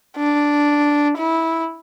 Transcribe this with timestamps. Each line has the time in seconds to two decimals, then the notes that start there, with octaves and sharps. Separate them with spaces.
0.17 D4
1.17 E4